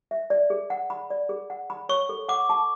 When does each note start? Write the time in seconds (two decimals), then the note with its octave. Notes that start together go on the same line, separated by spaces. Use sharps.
0.11 E5
0.30 D5
0.50 G#4
0.70 F#5
0.90 B5
1.10 D5
1.29 G#4
1.50 F#5
1.70 B5
1.89 C#5 C#6
2.09 A4
2.29 F#5 D6
2.49 A5